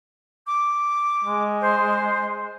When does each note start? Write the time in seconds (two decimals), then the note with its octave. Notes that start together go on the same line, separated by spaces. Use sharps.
0.46 D6
1.24 G#3
1.61 C5